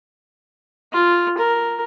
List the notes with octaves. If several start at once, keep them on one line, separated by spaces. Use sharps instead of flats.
F4
A#4